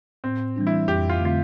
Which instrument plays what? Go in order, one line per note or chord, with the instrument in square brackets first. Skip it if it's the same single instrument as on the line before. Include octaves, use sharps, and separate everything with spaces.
[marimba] A2 [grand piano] C4
[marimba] E3 G3 D4
[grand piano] E4
[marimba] F2 [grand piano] G4
[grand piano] F4
[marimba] D3 A3 C4 [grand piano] F4